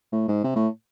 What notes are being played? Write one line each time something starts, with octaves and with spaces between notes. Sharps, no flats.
A2
G#2
C3
A2